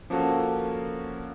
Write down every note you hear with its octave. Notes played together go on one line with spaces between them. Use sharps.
F3 A#3 C#4 F#4 A4